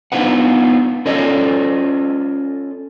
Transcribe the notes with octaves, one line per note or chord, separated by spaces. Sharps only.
B3 D4 D#4 F4 B4 F#5
C#4 F4 A4 D5 D#5